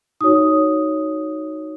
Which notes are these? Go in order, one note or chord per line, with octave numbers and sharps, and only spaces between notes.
D#4 F#4 C#5 D#6